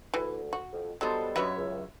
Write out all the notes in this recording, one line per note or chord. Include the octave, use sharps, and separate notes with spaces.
D2 E3
F#4
F2
F#3 G3 B3 A4 C5 D#5
F#2 F#4 B4 C#5 E5
C#2